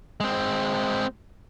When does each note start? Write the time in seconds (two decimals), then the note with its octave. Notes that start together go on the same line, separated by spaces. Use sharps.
0.20 G#3 C4